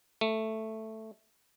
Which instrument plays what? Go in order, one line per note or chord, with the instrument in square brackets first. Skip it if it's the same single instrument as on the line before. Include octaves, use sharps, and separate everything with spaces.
[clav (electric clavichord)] A3